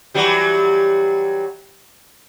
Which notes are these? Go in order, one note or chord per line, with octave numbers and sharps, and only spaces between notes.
E3 F#3 G3